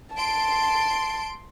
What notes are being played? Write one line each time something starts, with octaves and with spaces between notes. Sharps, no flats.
A5 C6 D7